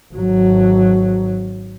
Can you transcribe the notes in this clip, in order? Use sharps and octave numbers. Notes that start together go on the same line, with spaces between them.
G#1 F#3